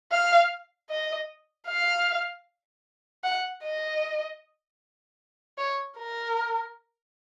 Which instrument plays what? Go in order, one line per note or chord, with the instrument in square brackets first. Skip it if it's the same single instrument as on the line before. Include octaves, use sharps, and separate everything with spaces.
[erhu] F5
D#5
F5
F#5
D#5
C#5
A#4